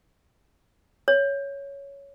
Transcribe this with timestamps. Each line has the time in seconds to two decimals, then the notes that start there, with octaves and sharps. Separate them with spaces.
1.08 C#5